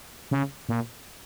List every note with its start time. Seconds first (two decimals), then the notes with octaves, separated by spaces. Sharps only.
0.31 C#3
0.69 A#2